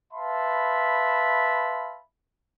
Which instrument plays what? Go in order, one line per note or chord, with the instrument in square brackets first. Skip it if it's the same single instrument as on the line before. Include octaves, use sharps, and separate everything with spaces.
[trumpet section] B4 E5 F5 A5 B5 C6